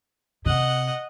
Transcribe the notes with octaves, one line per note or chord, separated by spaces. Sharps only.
C3 D#5 F#5